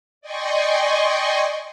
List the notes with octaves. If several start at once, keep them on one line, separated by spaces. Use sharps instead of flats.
D5 D#5 G5 G#5 C6 C#6